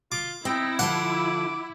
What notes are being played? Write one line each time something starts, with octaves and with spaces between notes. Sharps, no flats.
F4 D6
C4 D#4 E4 G5
D3 F3 F4 F#5 D6